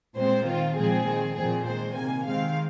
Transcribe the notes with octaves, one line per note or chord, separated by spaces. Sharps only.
A#2 G#3 C4 C5
D#3 C4 F4
A#2 F3 G#3 C4 G#4
D#3 C4
A#2 F3 C4 G#4
D#3 G#3 C4 C5
C3 D#3 A#3 G#5
D#3 G#3 C4 F5